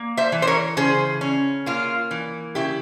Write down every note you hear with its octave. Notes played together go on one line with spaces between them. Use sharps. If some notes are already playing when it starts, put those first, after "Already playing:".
Already playing: A#3
C5 E5
E3
C5
A#4 C#5
C#3 G#4 C5
C#4
A#3 F4
E3
C#3 E4 G4